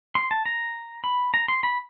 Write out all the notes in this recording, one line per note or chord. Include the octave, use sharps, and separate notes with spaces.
C6
A5
A#5
B5
A#5
C6
B5